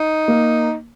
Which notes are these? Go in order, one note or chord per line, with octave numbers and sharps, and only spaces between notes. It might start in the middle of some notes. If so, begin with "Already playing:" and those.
Already playing: D#4
A#3